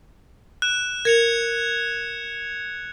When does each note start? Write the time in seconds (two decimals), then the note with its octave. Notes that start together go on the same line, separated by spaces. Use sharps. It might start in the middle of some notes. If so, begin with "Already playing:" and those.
0.62 F#6 E7
1.05 A#4 G#6 C#7 F7